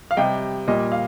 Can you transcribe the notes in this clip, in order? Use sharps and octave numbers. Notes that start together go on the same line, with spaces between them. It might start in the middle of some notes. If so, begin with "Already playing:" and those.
F5
C3 G3 D#5 G5
A#2 G3 D#5
F5